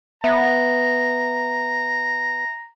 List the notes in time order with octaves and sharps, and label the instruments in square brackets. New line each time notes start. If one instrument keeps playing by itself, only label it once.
[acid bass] B3 [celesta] E5 [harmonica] A#5